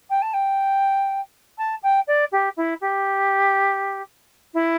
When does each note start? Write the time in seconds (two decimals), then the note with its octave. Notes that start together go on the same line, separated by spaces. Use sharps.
0.09 G5
0.22 A5
0.33 G5
1.58 A5
1.82 G5
2.07 D5
2.31 G4
2.56 E4
2.81 G4
4.54 E4